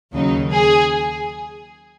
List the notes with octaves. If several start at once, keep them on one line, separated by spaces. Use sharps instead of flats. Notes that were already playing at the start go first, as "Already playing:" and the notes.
D#2 C#3 F#3 D#4
G#4